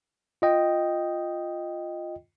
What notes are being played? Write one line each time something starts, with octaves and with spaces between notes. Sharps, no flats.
F4 D#5 G5